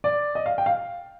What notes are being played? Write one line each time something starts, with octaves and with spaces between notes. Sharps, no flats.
D5
D#5
F5
G5
F5